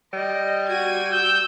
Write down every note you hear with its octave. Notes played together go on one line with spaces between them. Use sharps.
G3 D#5
F#4 G#6 D#7
E6 G6